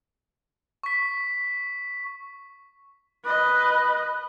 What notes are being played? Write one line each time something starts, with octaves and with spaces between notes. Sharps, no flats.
C#6 B6
B4 D#5